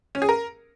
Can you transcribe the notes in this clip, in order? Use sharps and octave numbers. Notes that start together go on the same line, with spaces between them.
C#4
G#4
A#4